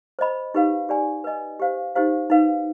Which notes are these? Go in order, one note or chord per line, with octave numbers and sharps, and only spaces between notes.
C5 D#5 B5
D#4 G4 B4 F5
G4 D5 G#5
B4 D#5 G#5
G4 C5 F5
D#4 G4 C5 F5
D#4 B4 F5